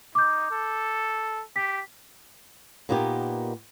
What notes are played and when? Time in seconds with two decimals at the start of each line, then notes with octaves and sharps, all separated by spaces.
0.15 D#4 D6 G6
0.51 A4
1.56 G4 B6
2.89 A#2 A#3 B3 D#4 G4